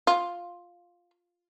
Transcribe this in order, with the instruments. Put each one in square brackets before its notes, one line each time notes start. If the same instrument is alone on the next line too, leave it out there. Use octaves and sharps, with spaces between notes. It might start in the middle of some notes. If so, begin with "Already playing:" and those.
[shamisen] F4